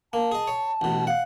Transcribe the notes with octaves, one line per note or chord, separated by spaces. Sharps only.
A#3 A5
G#4 D#5
C#5
A1 B2
F5 F#5